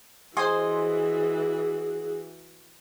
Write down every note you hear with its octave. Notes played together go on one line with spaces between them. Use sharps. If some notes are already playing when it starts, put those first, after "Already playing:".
E3 F#4 G#4 C5 D#5 G#5 C6